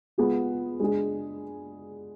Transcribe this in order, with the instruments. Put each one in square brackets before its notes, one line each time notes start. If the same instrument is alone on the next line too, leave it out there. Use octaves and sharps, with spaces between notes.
[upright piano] G#3 B3 F4 G#4
G#3 D4 G#4